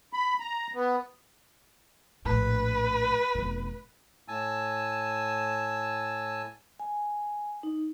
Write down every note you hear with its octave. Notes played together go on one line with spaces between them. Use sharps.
B5
A#5
B3
A#1 A2 B4
F1 B2
A2 G#5 A5 E6
G#5
D#4